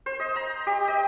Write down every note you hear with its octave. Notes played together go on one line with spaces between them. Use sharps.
C5
D#5
A#5
G4
D#5